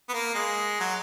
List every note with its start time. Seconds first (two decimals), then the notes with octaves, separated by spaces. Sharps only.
0.09 B3
0.13 A#3
0.35 G#3
0.80 F#3